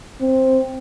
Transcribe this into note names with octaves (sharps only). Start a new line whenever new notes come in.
C4